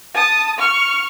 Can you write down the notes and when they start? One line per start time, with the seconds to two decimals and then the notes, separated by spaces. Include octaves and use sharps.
0.14 A5 D#6
0.58 C#6 F6